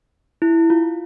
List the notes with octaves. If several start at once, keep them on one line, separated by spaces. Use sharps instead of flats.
E4
F4